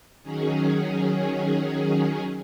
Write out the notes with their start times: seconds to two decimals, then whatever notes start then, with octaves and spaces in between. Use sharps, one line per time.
0.23 D#3 F#3 C#4 G#4